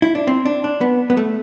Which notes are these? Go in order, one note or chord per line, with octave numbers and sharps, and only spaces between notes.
E4
D4
C4
D4
D4
B3
B3
A3